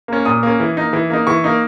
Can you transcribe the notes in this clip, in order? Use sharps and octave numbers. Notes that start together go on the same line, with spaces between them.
A#3 C#4
A#2 D#6
A#3 C#4
E3
A#3 D#4
E3
A#3 D#4
E3 C#6
A#3 D#4